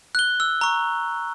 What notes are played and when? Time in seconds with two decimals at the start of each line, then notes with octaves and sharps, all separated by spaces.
0.15 F#6 G7
0.40 E6
0.61 A#5 C#6